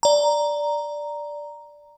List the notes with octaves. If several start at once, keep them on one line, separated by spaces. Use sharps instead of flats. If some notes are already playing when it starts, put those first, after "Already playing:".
D5 A#5